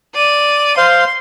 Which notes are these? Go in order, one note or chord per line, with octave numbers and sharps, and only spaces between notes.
D5 D#7
C5 F5 C6